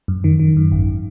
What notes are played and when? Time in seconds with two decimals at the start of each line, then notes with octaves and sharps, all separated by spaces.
0.08 F#2
0.24 D#3
0.40 D#3
0.57 F#2
0.72 G#1